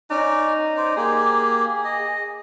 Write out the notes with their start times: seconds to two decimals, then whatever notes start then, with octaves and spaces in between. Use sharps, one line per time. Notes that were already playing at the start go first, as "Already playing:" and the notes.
0.10 C#4 D#4 D5
0.77 C5 D5
0.97 A#3 G4 G#4
1.84 D#5